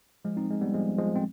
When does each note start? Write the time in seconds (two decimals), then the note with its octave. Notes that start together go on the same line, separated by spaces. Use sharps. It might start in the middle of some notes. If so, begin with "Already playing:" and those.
0.25 F3 G#3
0.37 C4 D#4
0.50 G#3
0.61 G3 B3
0.74 F3 G#3
0.98 F3 G#3
1.15 C4